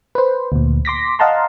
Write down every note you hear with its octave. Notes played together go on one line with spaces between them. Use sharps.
B4 C5
D2 A#2
C6 D6 A#6 B6
D#5 F5 F#5 A5 A#5 C6